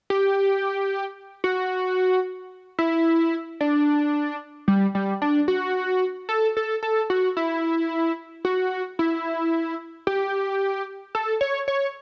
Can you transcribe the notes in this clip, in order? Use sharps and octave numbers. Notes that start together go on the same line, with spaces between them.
G4
F#4
E4
D4
G3
G3
D4
F#4
A4
A4
A4
F#4
E4
F#4
E4
G4
A4
C#5
C#5